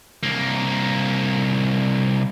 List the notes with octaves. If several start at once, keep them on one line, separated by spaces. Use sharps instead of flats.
C2 A#3